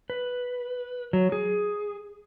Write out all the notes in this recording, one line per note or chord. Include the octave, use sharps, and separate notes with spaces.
B4
F#3
G#4